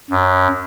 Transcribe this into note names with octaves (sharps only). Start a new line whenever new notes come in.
F#2